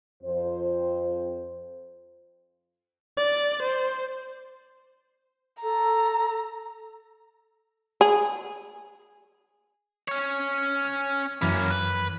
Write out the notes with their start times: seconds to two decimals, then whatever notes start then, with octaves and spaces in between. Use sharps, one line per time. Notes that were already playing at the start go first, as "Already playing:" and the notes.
0.23 F2 C5
3.17 D5
3.62 C5
5.62 A4 A#5
8.01 G#4
10.08 C#4 C#5
10.85 F6
11.42 F#2 E3 A#3 C#4 B5
11.71 B4